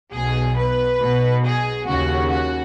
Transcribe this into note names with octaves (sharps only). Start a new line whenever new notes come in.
B1 B2 G#4
B4
B1 B2
G#4
D#2 C#3 F#4
F#4